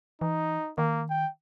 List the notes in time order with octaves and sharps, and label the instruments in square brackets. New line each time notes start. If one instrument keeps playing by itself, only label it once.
[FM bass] E3 [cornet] D#4
[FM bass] D#3 [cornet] A#3
[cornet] G5